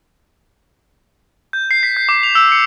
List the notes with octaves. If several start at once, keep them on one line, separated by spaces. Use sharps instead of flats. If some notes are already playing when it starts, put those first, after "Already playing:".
G6
C7
B6
G6
D6
F7
E6
C#7